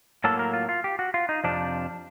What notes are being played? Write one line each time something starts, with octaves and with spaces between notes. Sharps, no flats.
A2 F#3 A#3 A4
A#4
F4
F4
G4
F#4
F4
D#4
F2 C3 F3 D4